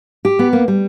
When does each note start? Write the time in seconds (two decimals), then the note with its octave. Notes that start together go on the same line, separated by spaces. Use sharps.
0.25 G4
0.39 B3
0.53 A#3
0.68 G3